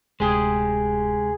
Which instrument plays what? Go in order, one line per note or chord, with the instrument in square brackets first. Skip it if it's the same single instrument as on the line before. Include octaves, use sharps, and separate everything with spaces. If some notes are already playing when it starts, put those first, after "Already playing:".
[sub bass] D1 [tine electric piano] D2 C3 [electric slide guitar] G#3 G4 [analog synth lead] G#4